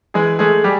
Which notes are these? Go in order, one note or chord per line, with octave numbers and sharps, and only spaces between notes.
E3 G#3 G#4
G#3 A3 G#4
G3 G4